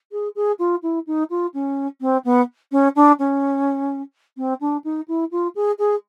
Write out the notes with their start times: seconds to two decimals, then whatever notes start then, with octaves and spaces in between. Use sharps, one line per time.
0.11 G#4
0.35 G#4
0.59 F4
0.82 E4
1.07 D#4
1.30 F4
1.54 C#4
2.01 C4
2.24 B3
2.71 C#4
2.95 D4
3.19 C#4
4.37 C4
4.60 D4
4.84 D#4
5.08 E4
5.31 F4
5.55 G#4
5.78 G#4